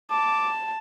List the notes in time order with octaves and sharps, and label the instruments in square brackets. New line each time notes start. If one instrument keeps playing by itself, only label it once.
[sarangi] A5 [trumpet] D6